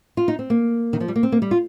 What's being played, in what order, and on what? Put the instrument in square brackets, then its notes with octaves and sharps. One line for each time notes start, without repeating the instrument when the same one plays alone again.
[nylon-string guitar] F4
D#4
C4
A#3
D#3
F3
G3
A#3
C4
A#3
G3
F4